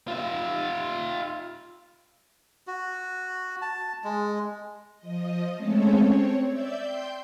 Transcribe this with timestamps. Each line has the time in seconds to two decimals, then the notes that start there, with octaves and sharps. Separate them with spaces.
0.08 F4 E5
2.67 F#4
3.62 A5
4.04 G#3
4.97 F3 D#5
5.55 G#3 A3 C4 C#4 A4 C#5
5.98 C4 C#5
6.47 D5 E5 E6 G6
6.78 G5 C6 G6